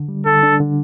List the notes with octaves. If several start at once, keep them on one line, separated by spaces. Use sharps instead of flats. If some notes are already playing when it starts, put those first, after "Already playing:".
Already playing: D3
G3
D3 A4
D4
D3